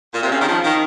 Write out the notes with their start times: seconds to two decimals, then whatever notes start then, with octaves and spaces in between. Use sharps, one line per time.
0.14 A#2
0.23 C3
0.32 C#3
0.41 D#3
0.49 F3
0.64 D#3